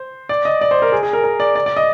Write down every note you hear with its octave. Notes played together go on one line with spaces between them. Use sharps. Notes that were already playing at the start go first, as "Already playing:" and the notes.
Already playing: C5
D5
D#5
D5
C5
A#4
G#4
G#4
A#4
A#4
D5
D5
D5
D#5